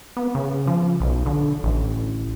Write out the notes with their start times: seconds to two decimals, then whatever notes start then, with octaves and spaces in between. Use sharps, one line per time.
0.17 B3
0.35 C#3
0.67 F3
1.00 B1
1.26 D3
1.63 A1